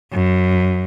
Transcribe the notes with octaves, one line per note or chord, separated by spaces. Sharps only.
F#2